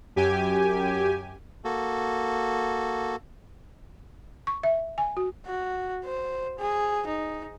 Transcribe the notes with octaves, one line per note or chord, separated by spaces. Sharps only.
F#2 G4 G#5
A#3 F#4 A4
C#6
E5
G#5
F#4
F#4
C5
G#4
D#4